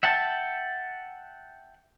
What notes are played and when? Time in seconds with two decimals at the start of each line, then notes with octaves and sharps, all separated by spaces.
0.03 E5 F#5 G5 A5